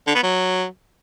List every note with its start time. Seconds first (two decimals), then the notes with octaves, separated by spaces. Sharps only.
0.07 D3
0.15 B3
0.23 F#3